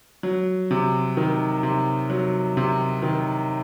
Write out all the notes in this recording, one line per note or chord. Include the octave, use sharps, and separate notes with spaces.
F#3
C3
D#3
C3
F#3
C3
D#3